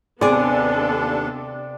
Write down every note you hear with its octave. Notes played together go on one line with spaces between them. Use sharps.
D#2 C3 B3 D4 G#4 A4 D5